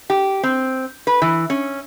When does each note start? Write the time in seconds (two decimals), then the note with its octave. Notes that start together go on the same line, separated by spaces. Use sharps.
0.10 G4
0.43 C4
1.07 B4
1.22 E3
1.50 C#4